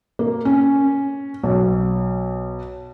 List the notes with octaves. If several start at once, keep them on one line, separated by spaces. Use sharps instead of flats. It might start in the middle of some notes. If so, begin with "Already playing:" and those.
A#3
C#4
B1